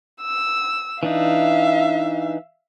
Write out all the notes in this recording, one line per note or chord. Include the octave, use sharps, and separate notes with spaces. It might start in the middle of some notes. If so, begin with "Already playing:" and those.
E6
E3 D4 D#4 E5 F5